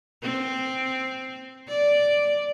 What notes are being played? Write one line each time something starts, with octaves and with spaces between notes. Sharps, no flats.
C4
D5